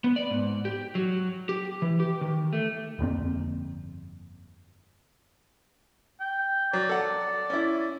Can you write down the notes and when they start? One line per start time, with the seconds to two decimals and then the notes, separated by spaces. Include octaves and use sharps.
0.04 B3
0.16 D5
0.30 G#2
0.65 G4
0.95 F#3
1.49 G4
1.82 E3
2.00 G4
2.21 D#3
2.53 A3
2.99 G1 F2 A#3 C4
6.20 G5
6.73 F#3 D5
6.89 A4 F#5
7.50 C#4 E4